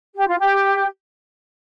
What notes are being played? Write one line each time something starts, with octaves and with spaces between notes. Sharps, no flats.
G4
F4
G4